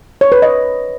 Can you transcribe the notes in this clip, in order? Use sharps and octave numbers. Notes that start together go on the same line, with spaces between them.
C#5
B4
D#5